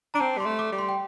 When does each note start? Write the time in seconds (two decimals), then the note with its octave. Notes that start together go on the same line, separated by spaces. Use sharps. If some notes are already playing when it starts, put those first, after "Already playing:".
0.14 D4 A#5
0.20 C4 A5
0.38 G3 C6
0.46 A3
0.59 D6
0.72 G3
0.78 C6
0.89 G5